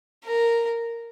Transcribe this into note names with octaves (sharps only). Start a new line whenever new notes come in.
A#4